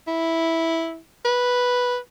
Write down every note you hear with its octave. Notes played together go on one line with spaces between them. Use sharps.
E4
B4